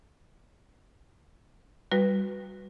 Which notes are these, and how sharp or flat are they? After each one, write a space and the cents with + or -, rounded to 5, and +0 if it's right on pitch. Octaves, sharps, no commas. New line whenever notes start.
G3 +0 F#4 -10 B4 +0